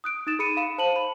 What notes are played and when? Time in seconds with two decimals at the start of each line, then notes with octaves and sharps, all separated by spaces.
0.04 D#6 F#6 D7
0.27 D#4 D#6 A6 E7
0.39 G#4 B5 C#7 D#7
0.57 F5 B5 E7
0.78 C5 A5 D#7 F#7
0.96 B5